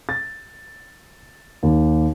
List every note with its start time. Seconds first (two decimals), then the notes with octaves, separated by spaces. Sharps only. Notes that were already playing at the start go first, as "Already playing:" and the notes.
0.09 A6
1.63 D#2